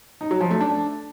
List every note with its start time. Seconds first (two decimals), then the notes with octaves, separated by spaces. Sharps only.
0.21 D#4
0.31 F#3
0.41 F3
0.51 A3
0.60 D4